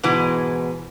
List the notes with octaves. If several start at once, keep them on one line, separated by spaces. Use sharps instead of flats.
G#2 B2 E3 G#3